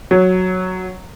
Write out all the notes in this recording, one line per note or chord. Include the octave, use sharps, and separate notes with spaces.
F#3